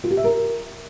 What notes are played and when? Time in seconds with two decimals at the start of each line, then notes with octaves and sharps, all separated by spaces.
0.04 F4
0.11 G4
0.17 E5
0.24 A#4